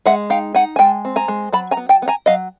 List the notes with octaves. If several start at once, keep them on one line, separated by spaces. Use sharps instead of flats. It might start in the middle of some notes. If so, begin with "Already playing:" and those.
G#3 E5 F#5
D#4 F5 G5
D#4 F#5 G#5
G#5
G#3 G5 A5
C4
G#5 A#5
G#3
F#3 A5 B5
G#5 A#5
B3
G5 A5
B3
G#5 A#5
F#3 D#5 F5